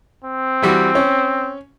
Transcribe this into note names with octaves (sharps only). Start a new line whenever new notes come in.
C4
E3 G3 F#4
C#4